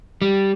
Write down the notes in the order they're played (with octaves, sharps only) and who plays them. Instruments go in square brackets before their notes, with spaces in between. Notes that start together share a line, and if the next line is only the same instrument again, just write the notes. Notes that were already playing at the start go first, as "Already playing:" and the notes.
[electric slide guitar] G3